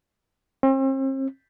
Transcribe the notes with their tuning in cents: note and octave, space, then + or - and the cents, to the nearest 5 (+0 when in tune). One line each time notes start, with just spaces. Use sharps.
C4 +40